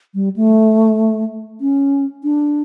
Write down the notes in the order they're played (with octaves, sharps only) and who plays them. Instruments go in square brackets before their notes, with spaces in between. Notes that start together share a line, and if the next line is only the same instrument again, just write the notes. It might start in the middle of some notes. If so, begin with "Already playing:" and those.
[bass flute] G3
A3
C#4
D4